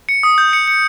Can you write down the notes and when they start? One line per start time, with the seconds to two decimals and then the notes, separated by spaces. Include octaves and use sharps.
0.09 C#7
0.23 D#6
0.38 G6
0.53 C#7
0.68 C#7